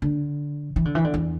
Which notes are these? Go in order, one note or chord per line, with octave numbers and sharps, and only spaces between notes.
D3
E3
D3
E3
D3
E2